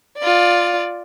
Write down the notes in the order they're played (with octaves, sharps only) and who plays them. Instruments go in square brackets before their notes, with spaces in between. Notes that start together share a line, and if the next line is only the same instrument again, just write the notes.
[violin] F4 D5